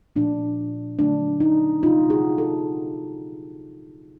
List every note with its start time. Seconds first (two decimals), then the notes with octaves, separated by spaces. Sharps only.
0.16 A#2 F3 A3 D4
0.99 D3 F#3 A3 D4
1.40 D#4
1.82 C3 F3 A3 C4 D#4 F4
2.10 F#4 G#4
2.38 G4 A4